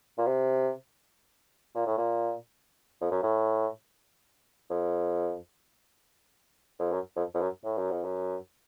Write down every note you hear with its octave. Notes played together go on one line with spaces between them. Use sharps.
A#2
C3
A#2
A2
A#2
F2
F#2
A2
F2
F2
F#2
F2
F2
F#2
A2
F#2
F2
F#2